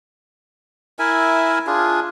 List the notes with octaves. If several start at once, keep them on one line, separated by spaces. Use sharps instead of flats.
E4 A#4 E5 G#5
D4 F4 G#4